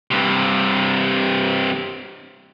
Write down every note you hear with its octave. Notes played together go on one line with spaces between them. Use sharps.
G2 C3